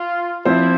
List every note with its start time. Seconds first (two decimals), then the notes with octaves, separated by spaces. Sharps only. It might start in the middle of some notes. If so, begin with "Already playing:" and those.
Already playing: F4
0.45 F3 C4 E4 F4 C5